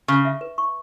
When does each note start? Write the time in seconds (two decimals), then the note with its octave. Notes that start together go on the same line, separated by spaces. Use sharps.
0.08 C#3 C#6
0.25 E5
0.41 B4
0.58 C#6